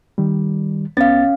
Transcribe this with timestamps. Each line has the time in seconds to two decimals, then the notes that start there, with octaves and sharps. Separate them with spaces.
0.18 D#3 G3
0.97 C2 B3 C#4 F5 A6